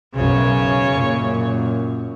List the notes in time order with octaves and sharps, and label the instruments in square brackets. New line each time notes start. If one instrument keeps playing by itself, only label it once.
[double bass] B1 F#2 [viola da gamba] C#3 C#5
[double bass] F#2 A#2